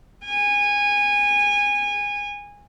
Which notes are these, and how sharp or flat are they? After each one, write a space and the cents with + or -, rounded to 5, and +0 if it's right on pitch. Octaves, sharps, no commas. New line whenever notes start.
G#5 -20